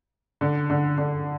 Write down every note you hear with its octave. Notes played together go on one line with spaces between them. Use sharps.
D3
D3
D3